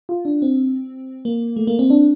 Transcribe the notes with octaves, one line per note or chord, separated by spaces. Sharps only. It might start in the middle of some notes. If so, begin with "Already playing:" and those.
F4
D4
C4
A#3
A3
A#3
C4
D4